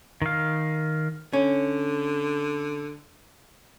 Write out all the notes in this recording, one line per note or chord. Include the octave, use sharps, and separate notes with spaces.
D#3 F5
D3 C#4